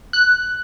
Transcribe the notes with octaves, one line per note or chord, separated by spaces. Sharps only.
F#6